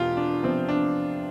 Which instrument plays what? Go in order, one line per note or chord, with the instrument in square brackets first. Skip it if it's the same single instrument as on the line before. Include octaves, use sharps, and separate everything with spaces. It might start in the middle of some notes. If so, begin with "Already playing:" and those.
Already playing: [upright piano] E1 E2 B2 [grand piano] F4 G4
[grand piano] D4
[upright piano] C3 F3 B3 [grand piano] C4
[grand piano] D4